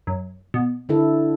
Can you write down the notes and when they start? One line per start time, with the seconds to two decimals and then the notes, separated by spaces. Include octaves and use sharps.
0.07 F#2
0.54 B2
0.89 D3 E4 A4